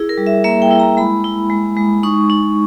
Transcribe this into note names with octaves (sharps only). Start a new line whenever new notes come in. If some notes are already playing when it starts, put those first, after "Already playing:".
Already playing: E4 G#4
A#4
G3
E5
A#3 E5
G5
E4
A#5
G#3 B5
E4
G#3
G#3
D#4 C#6
D#4